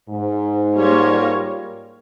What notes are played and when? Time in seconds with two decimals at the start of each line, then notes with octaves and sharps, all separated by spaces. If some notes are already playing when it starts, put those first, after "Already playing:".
0.09 G#2
0.77 G3 A#3 F4 A#4 C#5